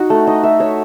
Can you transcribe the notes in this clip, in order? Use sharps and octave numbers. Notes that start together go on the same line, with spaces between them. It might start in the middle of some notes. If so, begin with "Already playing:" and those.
Already playing: D#4 F#4
A3
D#4
E5
C#5